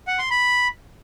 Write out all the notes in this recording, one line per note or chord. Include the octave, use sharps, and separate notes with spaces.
F#5
C6
B5